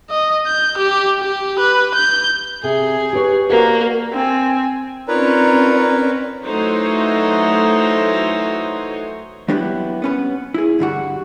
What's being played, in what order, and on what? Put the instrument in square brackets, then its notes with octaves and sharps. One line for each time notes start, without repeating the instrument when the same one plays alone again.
[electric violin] D#5
G6
G4
G4
B4
G6
[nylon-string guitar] C3 [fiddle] G#4
[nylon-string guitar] G4 B4 C#5
[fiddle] A#3 [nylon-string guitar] F#4 C5 D5
[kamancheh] C4 G#5
[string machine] C4 C#4 [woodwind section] D#4 F4 C#5 [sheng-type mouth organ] A#4 B4 [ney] D5
[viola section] E3 F#3 A3 D#4 C5 C#5
[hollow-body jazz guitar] F#3 G3 B3 D4 E4 G4
B3 C#4 B4
E4 G#4
G2 D3 G3 F#4